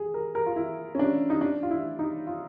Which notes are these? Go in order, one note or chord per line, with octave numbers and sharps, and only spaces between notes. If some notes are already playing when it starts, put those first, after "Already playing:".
Already playing: G#4
A#4
A#4
F4
E4
C#4
D4
D#4
D4
F4
E4
D#4
F4